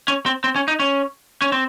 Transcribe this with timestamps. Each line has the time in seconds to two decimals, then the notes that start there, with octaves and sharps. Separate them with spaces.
0.08 C#4
0.26 C4
0.44 C4
0.56 C#4
0.68 D#4
0.80 C#4
1.42 C#4
1.52 C4